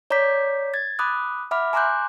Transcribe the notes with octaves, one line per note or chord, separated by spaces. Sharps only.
C#5 D5 A#5 D6 G6 B6
G#6 A6
B5 D6 D#6 F#6
E5 F#5 B5 D6 F6
G#5 A#5 C6 D6 F#6 G6